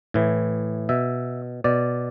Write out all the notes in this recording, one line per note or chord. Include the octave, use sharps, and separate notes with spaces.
A2 E3
B2 E5
B2 D5